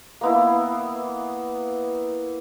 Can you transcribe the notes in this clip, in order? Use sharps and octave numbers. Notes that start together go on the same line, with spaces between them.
A#3 B3 E4